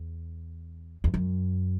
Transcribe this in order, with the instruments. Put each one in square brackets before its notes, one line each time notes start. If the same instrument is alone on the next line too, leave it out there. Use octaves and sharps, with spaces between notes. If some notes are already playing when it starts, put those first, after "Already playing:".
Already playing: [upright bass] E2
E2
F#2